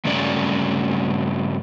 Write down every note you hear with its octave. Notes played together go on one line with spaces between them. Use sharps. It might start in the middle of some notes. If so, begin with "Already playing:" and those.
G2 C#3 F#3 A3 C#4 D5